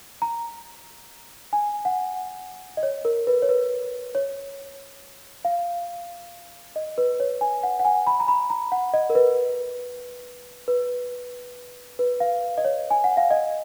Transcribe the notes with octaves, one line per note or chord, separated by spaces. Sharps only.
A#5
G#5
F#5
D#5
C#5
A#4
B4
C#5
B4
C#5
F5
D#5
B4
C#5
G#5
F#5
F#5
G#5
B5
A#5
B5
A#5
F#5
D#5
A#4
B4
B4
B4
F5
D#5
C#5
G#5
F#5
F5
D#5